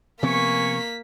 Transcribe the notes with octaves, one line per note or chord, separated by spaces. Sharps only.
C3 F3 A#3 B3 G#5 C#6 B6